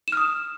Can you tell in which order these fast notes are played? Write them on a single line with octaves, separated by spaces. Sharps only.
E7 F6 D#6